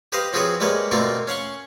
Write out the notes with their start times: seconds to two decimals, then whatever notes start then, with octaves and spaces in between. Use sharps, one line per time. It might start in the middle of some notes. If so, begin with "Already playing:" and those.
0.12 G4 B4 C5 D#5 F5
0.33 F3 C4 F#4 G#4 B4 C#5
0.60 G3 G#3 A#3 B4 C#5
0.91 B2 D3 A3 A#3 C4 F4
1.27 C#4 F5 F#5 C#6